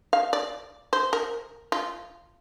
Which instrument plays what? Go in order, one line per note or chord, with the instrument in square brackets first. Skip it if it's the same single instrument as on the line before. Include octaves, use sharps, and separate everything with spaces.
[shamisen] F5
D5
C5
A#4
F4